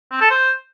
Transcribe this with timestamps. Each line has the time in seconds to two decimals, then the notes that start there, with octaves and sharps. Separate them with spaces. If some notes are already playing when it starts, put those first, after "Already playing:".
0.11 C4
0.21 A4
0.30 C5